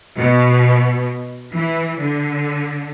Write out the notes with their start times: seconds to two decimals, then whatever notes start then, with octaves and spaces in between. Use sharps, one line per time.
0.20 B2
1.54 E3
2.01 D3